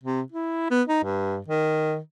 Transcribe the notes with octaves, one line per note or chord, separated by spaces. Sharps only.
C3
E4
B3
D#4
G2
D#3